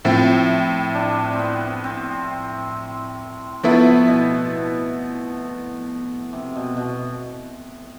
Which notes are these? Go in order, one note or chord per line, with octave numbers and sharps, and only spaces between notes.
A2 F3 C4 E4
D4
C4
B3
C4
F3 A3 B3 E4
B2
C3
B2
B2